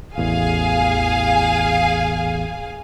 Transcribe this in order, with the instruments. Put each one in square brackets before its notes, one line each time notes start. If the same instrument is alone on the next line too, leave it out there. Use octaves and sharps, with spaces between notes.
[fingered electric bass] A1 E2 [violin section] G#4 F5 G#5